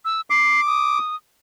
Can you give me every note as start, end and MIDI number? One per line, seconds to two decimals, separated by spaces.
0.05 0.21 88
0.30 0.99 86
0.30 0.61 96
0.67 1.16 87